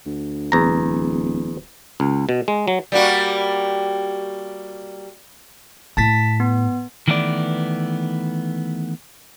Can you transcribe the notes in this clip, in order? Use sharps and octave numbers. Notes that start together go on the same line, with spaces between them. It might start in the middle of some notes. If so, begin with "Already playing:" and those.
D2
D1 E2 A#5
C#2
B2
G#3
F#3
G3 A#3 F#4
A2 A5 A6 B6
B3
D#3 E3 A3 B3 G#4 D5